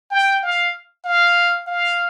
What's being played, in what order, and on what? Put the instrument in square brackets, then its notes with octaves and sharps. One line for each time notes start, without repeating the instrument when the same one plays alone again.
[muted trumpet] G5
F5
F5
F5